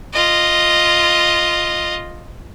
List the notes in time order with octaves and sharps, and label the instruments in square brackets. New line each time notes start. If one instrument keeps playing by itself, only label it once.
[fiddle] F4 D#5